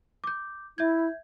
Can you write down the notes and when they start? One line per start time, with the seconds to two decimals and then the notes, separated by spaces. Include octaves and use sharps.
0.24 D6 G6
0.78 E4 E5 G6 G#6